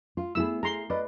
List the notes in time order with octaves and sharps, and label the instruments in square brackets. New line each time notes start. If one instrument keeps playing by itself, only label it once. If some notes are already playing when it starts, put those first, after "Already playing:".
[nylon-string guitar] F4
[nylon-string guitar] A3 B3 G#4 [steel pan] E4 E6
[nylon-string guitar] G#4 [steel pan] A#5 C6
[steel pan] B4 D5 [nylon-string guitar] D#5